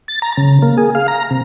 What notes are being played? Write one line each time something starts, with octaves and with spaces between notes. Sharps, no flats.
A6
A#5
C#3
A#3
G#4
F5
A#5
C3